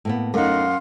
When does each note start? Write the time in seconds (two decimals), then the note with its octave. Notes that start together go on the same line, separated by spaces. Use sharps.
0.05 A2 A#3 B3
0.34 F#2 A3 D#4 F5 F#5 C6